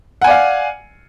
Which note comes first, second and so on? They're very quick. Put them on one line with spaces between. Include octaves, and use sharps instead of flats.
F#5 G#5 D5 F5